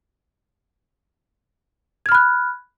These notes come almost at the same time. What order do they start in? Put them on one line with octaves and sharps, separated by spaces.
G#6 F6 B5 F#6